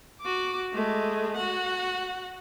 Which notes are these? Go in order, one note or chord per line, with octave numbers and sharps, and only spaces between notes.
F#4 D6
G#3 A3
F#4 F#5